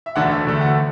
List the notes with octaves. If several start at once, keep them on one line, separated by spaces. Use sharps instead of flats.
E5
E1 D2 D3 A3 F#5
E5
E1 D2 D3 A3
F#5